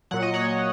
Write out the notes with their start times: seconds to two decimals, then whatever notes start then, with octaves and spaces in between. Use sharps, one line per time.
0.11 A#2 F#3 F#5
0.22 D#5
0.34 C#5 F#5